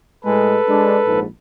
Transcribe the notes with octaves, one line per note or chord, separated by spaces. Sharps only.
A2 G#3 A4 B4
G#3 D4
A#1 G#2